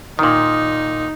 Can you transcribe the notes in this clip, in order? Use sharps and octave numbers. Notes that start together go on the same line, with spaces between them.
A#2 D#3 D#4